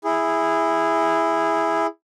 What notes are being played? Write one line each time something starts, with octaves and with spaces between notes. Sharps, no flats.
E4 G#4